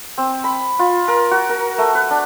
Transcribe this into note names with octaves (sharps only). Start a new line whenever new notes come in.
C4
B5
F4
A#4
F#4
A#4
A3
B4
D4